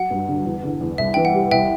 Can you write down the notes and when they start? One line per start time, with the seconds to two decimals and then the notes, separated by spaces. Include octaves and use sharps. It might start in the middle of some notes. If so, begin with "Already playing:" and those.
Already playing: F#3 F#5
0.10 G2
0.28 D3
0.45 E2
0.64 D3
0.81 E2
0.98 C2 E5
1.14 E3 G5
1.25 F#5
1.34 G3
1.51 C2 E5 G5